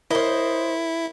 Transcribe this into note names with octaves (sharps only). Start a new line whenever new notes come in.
E4 A#4 C5 C#5 D#5